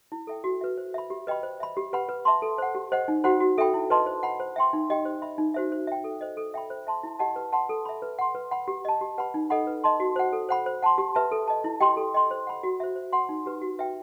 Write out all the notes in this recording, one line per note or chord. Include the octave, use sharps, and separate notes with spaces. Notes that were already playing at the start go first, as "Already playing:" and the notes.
E4
A4 E5 G5
F#4
B4 E5
C5
E5 B5
G4
B4 D#5 G5 B5
C5
E5 B5
G4
B4 F#5 B5
B4
E5 A5 C6
A4
C5 F#5
G4
C5 D#5 F#5
D#4
F#4 C5 F#5 B5
F#4
A4 E5 G5 B5
E4
B4 D#5 A5 C6
C5
F#5 B5
C5
E5 G5 C6
D#4
G4 D#5 G5
C5
E5 B5
D#4
F#4 C5 E5
C5
E5 G5
A4
C5 D#5
A4
E5 G5 B5
C5
E5 A5 C6
E4
G4 D#5 F#5 A5
B4
F#5 A5 C6
A4
E5 B5
B4
F#5 C6
B4
F#5 B5
G4
D#5 A5
G4
B4 F#5 B5
D#4
A4 D#5 F#5 B5
B4
D#5 A5 C6
F#4
C5 F#5
A4
C5 F#5 B5
C5
F#5 A5 C6
G4
B4 E5 A5
A4
D#5 A5
E4
G4 D#5 G5 C6
A4
D#5 G5 C6
C5
F#5 B5
F#4
C5 E5
C5
F#5 C6
D#4
G4 B4
F#4
B4 E5 G5